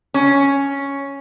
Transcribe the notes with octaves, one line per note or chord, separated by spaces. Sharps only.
C#4